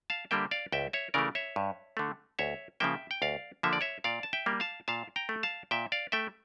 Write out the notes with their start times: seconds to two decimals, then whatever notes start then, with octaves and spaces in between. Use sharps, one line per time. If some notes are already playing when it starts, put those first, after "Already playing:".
0.10 F5 A5
0.31 D3 G3 A#3 E5 G5
0.51 D5 F5
0.72 C#2 E5 G5
0.93 C#5 E5
1.14 C#3 E3 A3 A#4 D5
1.35 C#5 E5
1.56 G2
1.97 D3 A3
2.39 D2 C#5 E5
2.80 C#3 F3 A#3 E5 G5
3.11 G5
3.22 D2 D5 F5
3.63 D3 F3 A#3 E5
3.73 D5
3.81 C#5 E5
4.04 A#2 D5 F5
4.23 A5
4.33 E5 G5
4.46 G3 A#3
4.60 F5 A5
4.88 A#2 F5 A5
5.16 G5 A#5
5.29 A3
5.43 F5 A5
5.71 A#2 E5 G5
5.92 D5 F5
6.12 A3 E5 G5